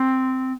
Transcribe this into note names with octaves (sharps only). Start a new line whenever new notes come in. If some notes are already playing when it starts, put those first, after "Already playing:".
Already playing: C4